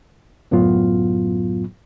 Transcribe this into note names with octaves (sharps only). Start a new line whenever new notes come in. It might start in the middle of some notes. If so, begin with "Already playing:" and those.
C#2 F#2 A2 F#3 B3 F4